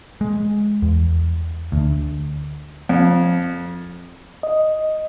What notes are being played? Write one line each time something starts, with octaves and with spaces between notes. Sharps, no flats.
G#3
E2
D2
F2
D#5